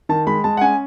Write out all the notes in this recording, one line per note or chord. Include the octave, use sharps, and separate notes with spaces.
D#3 A5
G#3 B5
G#3 A5
F#5
C#4 G#5